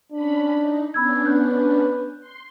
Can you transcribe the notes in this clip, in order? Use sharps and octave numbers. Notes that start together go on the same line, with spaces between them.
C#4 D4 B5
D#4
B3 C#4 D4 B5 E6 G#6
B4 F#6 G6
C6